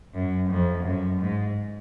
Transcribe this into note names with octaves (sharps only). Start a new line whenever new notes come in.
F#2
F2
F#2
G#2